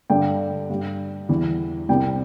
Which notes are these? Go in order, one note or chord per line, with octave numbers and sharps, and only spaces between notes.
G2 D3 G3 G5
G2 G3
E2 E3 G3
C2 C3 G3 G5